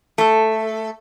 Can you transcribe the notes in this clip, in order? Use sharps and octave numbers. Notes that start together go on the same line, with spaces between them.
A3 A4